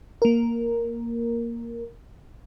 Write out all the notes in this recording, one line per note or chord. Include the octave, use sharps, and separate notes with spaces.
A#3 A#4